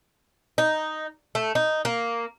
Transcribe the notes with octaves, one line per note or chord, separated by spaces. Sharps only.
D#4
A3
D#4
A#3